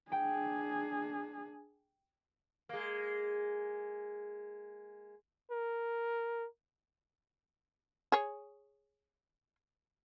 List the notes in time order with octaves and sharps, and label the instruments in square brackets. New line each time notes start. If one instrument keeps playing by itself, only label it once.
[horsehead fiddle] D4 G#4 [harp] G5
[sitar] G#3 A#3
[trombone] A#4
[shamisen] G#4 C#5